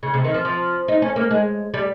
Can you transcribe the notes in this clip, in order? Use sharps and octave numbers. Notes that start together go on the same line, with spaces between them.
C#3
C3
D#3
F3
F3
D#4
C#4
A#3
G#3
G3